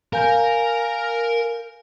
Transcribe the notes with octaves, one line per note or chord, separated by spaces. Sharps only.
A#4 F5 G#5 G6